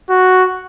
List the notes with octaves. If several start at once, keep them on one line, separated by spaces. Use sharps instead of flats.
F#4